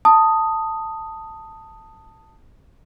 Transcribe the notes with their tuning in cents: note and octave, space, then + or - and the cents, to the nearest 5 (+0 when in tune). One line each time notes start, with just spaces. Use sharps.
A5 +15 D#6 +0